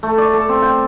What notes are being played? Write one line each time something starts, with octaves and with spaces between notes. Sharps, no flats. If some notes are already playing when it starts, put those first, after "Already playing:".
A3
D5
A4
C4
G5